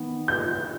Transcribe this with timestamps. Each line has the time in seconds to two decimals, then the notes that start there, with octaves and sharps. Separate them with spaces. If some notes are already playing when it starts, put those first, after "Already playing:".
Already playing: D#3 B3
0.28 G6